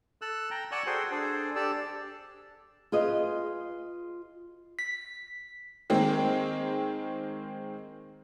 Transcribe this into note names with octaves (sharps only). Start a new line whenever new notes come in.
A4 E6 F#6
G5 A#5
D5 F#5 G#5 C#6 E6 F#6
F#4 G#4 A4 C5 G5
D4 G#4 A4 C5
D4 G4 A4 D5 E6
F4 G#4 B4 D#5
B6
D#3 G#3 A#3 C4